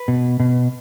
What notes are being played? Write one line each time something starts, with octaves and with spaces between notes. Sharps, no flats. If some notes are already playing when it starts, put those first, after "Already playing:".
Already playing: B4
B2
B2